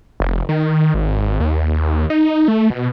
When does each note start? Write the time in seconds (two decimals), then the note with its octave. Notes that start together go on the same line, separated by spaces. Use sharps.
0.20 F1
0.49 D#3
0.94 G#1
1.40 D#2
2.10 D#4
2.48 A3
2.70 B2